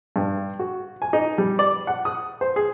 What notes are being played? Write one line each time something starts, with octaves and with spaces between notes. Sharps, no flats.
G2
F#4
G#5
D#4
G3
D5
F#5
D#6
C5
G#4